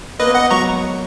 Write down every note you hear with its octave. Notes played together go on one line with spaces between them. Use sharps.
A#3 B4 D#5
B3
A#3 D#5 F#5
F#3 A#5 C#6